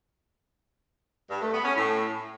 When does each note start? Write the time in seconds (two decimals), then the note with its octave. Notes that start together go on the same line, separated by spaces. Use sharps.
1.30 G2
1.42 A3
1.53 B3
1.65 C#4
1.76 A2